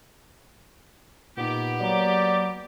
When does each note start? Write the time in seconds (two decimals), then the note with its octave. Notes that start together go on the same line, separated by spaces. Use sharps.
1.37 A#2 B3 D#4 G4
1.81 F#3 A#3 D5 A#5